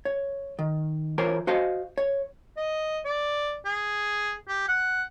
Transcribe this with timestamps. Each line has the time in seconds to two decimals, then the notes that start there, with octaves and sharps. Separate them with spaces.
0.05 C#5
0.59 D#3
1.18 E3 F4 A#4 C5 C#5
1.47 F#4 C5 D#5 F5
1.98 C#5
2.57 D#5
3.05 D5
3.65 G#4
4.48 G4
4.68 F#5